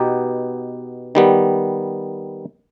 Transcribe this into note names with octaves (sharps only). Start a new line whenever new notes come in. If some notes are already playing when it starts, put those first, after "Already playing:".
Already playing: B2 B3 D#4 G4
D#3 G3 B3